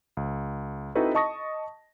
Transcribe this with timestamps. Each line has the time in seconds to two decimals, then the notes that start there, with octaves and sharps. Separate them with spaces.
0.17 C#2
0.95 C4 D#4 E4 F#4 A4 B4
1.15 D#5 A5 C#6 D#6 A#6